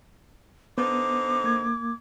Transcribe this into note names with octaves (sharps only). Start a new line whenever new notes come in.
D3 B3 D#4 C5 D6
A#3 G#6